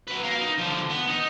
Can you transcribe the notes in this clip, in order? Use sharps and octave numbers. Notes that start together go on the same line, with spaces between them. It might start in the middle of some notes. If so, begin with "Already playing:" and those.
F#3 B4
A#4 F5
D#4
D3 F3
B3
D#4